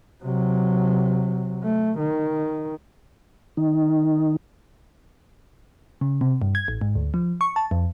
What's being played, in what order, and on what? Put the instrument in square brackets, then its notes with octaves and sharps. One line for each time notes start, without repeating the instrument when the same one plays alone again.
[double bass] C3 F#3
A3
D#3
[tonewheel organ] D#3 D#4
[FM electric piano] C#3
C3
G2
G#6
A1
G#2
D2
F3
C#6
A5
F2